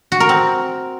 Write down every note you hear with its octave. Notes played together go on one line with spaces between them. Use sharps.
F#4
A#4
C4